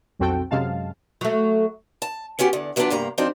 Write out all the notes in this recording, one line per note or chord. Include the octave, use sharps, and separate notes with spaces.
B1 F2 C4 F#4 A4 G5
F#2 C3 F#3 G#3 F5 A5
F#3 A3
A5
B3 C#4 F#4 G4
E2 D3
E3 F#3 B3 C4 D4 F4
G2 C3 A#3 A#5
F3 F#3 C4 D4 D#4